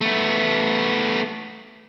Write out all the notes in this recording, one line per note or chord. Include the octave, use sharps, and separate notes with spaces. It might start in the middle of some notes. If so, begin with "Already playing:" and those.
A3 B3